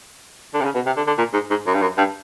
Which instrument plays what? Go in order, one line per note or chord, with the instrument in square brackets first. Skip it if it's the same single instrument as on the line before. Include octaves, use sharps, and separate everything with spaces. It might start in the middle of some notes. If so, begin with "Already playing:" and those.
[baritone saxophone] D3
C3
C#3
B2
C3
D3
D3
A#2
G#2
G#2
F#2
G2
F#2
G2